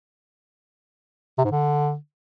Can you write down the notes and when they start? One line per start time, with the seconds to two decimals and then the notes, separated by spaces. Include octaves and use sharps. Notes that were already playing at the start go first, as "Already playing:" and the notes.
1.38 C3
1.45 G#2
1.51 D3